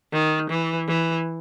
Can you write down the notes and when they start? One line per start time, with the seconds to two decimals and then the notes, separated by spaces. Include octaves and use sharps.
0.13 D#3
0.50 E3
0.88 E3